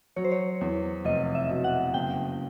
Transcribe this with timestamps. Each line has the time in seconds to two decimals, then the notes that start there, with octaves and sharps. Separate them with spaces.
0.16 F#3 C#5
0.24 C5
0.32 C#5
0.61 E2
1.04 F1 D#5
1.35 E5
1.49 B2
1.64 F#5
1.94 F#1 G5